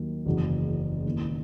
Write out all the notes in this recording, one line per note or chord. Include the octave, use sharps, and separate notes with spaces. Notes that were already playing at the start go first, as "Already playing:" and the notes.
Already playing: D#2 D#3 F#3 A#3 D#4
F#1 E2 C#3 F#3
E1 D#2 D#3 A#3 E4